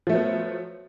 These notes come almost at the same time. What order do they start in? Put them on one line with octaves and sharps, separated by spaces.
F3 A3 F#3 B3